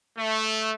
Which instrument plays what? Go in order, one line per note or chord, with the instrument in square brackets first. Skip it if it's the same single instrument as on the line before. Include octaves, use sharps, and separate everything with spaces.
[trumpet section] A3